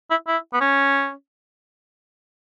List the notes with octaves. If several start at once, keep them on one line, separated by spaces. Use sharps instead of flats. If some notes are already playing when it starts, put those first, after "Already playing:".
E4
E4
B3
C#4